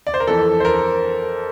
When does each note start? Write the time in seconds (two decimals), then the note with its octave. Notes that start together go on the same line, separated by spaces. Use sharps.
0.07 D5
0.14 C5
0.20 A#4
0.27 F2 E3 A4
0.60 C5
0.65 A#4